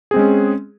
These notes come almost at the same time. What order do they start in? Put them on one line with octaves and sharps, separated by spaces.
G#4 C4 G#3 C#4